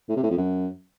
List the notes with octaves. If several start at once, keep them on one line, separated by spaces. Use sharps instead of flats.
A2
C3
A2
F2
F#2